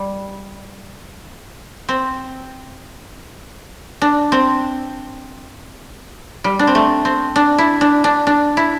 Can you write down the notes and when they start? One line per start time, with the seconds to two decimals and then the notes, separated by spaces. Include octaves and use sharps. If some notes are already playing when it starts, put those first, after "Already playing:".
Already playing: G3
1.89 C4
4.02 D4
4.32 C4
6.44 G3
6.59 D4
6.67 C4
6.75 A3
7.05 C4
7.36 D4
7.58 E4
7.81 D4
8.04 D4
8.27 D4
8.57 E4